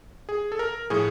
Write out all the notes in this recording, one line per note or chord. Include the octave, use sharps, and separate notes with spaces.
G#4
A4
A#4
A2 F3 G#4